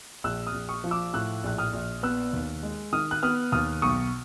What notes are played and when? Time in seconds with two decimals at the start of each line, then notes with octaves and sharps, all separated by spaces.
0.24 A#1 E6 F#6
0.47 D#6 F6
0.54 A#1
0.69 C#6 D#6
0.84 F3
0.91 D6 E6
1.14 A2 E6 F#6
1.44 A#1 F#6
1.58 D#6 F6
1.73 A#1
2.03 B3 E6 F#6
2.33 D#2
2.63 G#3
2.93 D#3 D#6 F6
3.11 F#6
3.23 B3 D#6 F6
3.52 D#2 D#6 F6
3.82 B1 C#6 D#6